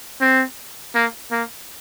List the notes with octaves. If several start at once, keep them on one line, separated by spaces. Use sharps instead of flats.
C4
A#3
A#3